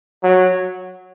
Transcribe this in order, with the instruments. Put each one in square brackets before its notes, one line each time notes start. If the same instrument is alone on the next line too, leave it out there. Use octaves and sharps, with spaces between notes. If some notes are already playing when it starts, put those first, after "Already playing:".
[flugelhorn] F#3